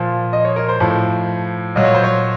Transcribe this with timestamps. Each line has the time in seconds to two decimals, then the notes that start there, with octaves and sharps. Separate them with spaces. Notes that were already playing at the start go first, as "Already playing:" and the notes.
Already playing: A#2 F3
0.33 D#5
0.45 C#5
0.56 A#4
0.69 C5
0.80 A2 F3
1.76 A#2 F#3 D#5
1.85 C#5
1.95 C5
2.04 C#5